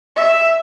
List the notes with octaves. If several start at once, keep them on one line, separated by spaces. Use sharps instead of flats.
E5